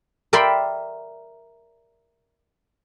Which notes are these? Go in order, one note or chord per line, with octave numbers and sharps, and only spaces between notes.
A#4 D5 E5 G5 B5 C6